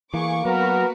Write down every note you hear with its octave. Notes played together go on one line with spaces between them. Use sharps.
E3 A#3 G#4 C#6 D6
F#3 B3 F#4 A#4 B4